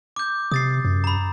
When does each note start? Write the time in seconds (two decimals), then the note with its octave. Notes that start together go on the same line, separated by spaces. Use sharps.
0.16 D6 G6
0.52 C3 D#6 A6 C7
0.85 F#2
1.04 A#5 B5